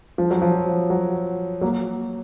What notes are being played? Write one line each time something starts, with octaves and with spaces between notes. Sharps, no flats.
F3
F#3
F3
F#3
F#3 A#3